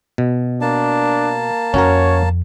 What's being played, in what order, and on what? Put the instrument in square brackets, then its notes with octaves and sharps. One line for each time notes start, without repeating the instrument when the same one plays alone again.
[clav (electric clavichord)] B2
[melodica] A#3 A5 [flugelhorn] D4
[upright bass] F2 [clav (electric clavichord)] C#4 F#4 A#4 [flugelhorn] C#5